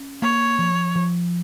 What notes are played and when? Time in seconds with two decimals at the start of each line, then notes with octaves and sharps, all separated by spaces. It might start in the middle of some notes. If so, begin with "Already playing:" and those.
Already playing: C#4
0.22 A#3 C#5
0.58 F3
0.95 F3